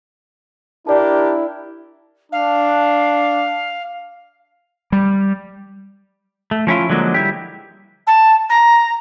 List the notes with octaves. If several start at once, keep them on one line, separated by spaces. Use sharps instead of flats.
D4 E4 G4 A#4 D5 A5
D4 F5
G3
A3
F3 C#4 E4 F4
D3 F3 F#3 G#3 A#3
G3 E4 G4
A5
A#5